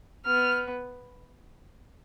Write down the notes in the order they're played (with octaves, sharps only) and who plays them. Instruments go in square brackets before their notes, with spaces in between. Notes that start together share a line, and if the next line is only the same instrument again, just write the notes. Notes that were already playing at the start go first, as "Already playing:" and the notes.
[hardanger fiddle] B3 [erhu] F6